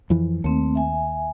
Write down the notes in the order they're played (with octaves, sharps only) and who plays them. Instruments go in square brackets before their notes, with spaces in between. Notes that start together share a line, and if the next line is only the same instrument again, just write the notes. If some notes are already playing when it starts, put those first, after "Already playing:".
[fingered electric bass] F2 E3
[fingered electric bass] D#2 [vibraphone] A3 C4
[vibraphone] E5 G#5